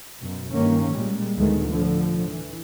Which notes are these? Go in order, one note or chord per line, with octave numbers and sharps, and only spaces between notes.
F#2 B2
G2 D#3 A#3 C#4
A#2 G3 G#3
D2 A2 D#3 G#3 A3 B3
A2 D3 F3
E3